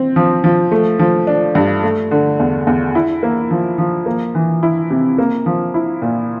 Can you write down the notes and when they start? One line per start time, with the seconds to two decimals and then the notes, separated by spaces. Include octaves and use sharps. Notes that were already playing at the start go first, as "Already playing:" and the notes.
Already playing: C4
0.16 F3
0.44 F3
0.72 A3
0.99 F3
1.27 D4
1.55 G2
1.83 A3
2.11 D3
2.40 E2
2.67 E2
2.95 E4
3.23 A#3
3.51 F3
3.78 F3
4.06 A#3
4.35 E3
4.63 E4
4.91 C3
5.18 A#3
5.46 F3
5.74 E4
6.02 A#2